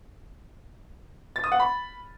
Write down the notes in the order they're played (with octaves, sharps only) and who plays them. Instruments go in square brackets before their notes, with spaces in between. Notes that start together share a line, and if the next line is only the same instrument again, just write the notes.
[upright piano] A6
D#6
F#5
B5